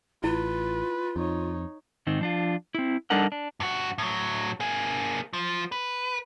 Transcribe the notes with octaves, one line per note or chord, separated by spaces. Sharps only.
A1 E4 F4 B4
F2 D#4 C#5
G#2 D#3 C4 D#4
F3 D4 F4
C4 E4
G3 D4 D#4 A4 A#4 F#5
D4
G2 F#4
A2 F#3
A#3 G#4
F3
B4